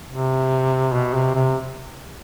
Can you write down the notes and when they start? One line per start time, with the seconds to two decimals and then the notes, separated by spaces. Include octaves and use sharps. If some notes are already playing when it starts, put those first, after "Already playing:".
0.11 C3
0.93 B2
1.14 C3
1.35 C3